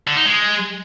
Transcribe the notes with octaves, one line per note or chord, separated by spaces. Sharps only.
D3
D#4
G#3